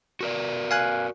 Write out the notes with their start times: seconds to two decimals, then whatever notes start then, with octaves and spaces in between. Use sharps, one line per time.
0.21 F#4 A#4 D5
0.71 F5 G#5 F#6